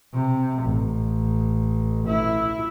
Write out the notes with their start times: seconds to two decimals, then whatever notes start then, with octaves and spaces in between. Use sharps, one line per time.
0.13 C3
0.63 A1
2.07 E4